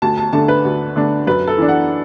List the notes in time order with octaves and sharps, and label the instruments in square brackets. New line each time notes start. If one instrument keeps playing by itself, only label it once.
[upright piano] D2 A5
A5
D3 A3 D4 A5
B4
D2
D3 A3 D4
F#2 B4
A4
E3 D4
F#5